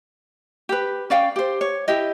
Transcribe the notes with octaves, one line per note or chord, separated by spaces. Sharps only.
G4 B4
C#4 D5 F5 G5
G4 C5
C#5
E4 G4 D#5